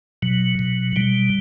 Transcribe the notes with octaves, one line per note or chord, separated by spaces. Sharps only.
B2 F#3
B2
B2 G3